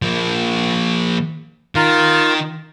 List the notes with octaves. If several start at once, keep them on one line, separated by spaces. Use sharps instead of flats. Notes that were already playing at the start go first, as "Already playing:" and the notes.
F3 A#3
D#3 F4 A#4 F5